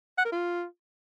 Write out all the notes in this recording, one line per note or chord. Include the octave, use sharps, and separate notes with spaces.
F#5
A#4
F4